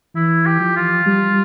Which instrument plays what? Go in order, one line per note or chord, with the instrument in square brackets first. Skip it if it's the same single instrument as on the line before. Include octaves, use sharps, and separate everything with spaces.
[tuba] E3 [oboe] E4
[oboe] G4
[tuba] F3
[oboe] F4
[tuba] G3